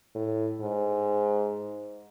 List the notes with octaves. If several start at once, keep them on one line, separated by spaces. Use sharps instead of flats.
A2
G#2